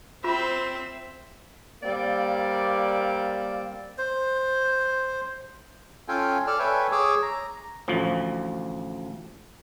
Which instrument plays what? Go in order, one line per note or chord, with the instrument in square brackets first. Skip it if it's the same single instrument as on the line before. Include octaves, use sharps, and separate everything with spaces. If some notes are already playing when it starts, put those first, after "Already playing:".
[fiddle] C4 [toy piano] F4 B5 [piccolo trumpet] C5 [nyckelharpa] E5
[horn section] G3 A#3 C4 D5 F5
[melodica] C5
[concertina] C#4 F4 A4 F5 G5 G#5
A4 D5 A5 F6
A4 B4 C#5 E5 G5 G#5
G#4 C#5 G#5 D6 E6
A#5
[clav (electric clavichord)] A1 D2 F3